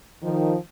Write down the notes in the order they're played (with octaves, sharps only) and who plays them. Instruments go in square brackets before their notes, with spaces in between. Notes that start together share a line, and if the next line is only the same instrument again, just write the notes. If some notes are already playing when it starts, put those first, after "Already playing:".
[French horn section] D#3 F3